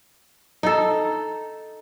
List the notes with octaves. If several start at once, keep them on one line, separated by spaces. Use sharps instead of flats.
D#4 A4